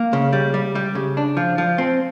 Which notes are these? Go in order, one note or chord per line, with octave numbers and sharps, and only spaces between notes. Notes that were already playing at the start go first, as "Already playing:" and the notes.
Already playing: A#3
C#3
G3
G3
G3
C#3
D4
F3
F3
C4